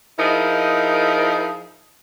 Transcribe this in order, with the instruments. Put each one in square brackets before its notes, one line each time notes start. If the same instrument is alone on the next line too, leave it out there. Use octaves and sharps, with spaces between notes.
[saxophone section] F3 D#4 E4 G#4 A#4 D#5